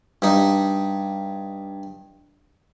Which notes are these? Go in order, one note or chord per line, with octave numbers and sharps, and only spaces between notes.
G2 D#4